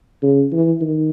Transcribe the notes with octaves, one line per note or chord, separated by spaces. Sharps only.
C#3
E3
D#3